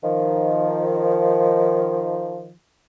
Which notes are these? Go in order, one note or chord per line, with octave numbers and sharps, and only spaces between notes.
D#3 F3